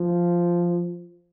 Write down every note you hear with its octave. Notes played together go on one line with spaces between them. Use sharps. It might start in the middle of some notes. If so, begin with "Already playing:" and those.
Already playing: F3